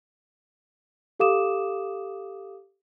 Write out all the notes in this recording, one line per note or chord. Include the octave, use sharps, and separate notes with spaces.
G4 A4 F5 D6 D#6 E7